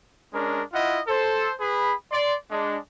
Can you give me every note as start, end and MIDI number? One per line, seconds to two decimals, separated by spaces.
0.33 0.61 56
0.33 0.61 61
0.33 0.61 62
0.33 0.61 70
0.73 0.99 64
0.73 0.99 65
0.73 0.99 75
0.73 0.99 78
1.08 1.50 69
1.08 1.50 72
1.59 1.93 68
1.59 1.93 71
1.59 1.93 83
2.11 2.35 74
2.11 2.35 84
2.51 2.77 56
2.51 2.77 62